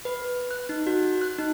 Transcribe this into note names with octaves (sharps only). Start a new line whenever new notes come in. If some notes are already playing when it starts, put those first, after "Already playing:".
B4
F#6
D#4
F#4
F#6
D#4